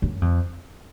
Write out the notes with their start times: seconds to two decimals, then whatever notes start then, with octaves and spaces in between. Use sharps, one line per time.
0.02 F#2
0.22 F2